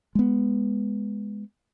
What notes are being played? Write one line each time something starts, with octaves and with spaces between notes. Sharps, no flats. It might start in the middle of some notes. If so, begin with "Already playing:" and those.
G#3 B3